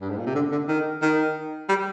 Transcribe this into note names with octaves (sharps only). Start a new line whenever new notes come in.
G2
G#2
A#2
C3
D3
D3
D#3
D#3
G3